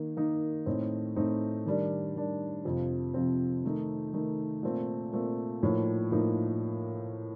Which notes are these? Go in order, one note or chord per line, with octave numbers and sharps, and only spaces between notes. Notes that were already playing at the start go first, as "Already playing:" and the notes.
Already playing: D#3 A#3 D#4
D#3 A#3 D#4
A2 A3 C4 D#4
A2 A3 C4 D#4
D#3 G3 D4
D#3 G3 D4
F2 C3 F3 C4
F2 C3 F3 C4
D#3 A3 D#4
D#3 A3 D#4
A#2 A3 C4
A#2 A3 C4
A2 F3 A#3 D#4
A2 F3 A#3 D#4